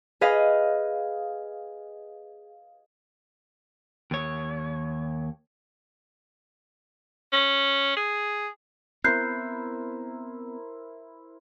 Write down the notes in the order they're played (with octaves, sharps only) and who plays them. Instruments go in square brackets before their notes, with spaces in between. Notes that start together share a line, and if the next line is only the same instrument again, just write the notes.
[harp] G#4 B4 D#5 F5 G#5
[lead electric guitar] D#2 C#5
[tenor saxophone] C#4
G#4
[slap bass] B3 C4 [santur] E4 A#4 C5 [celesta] F#6 G6 C7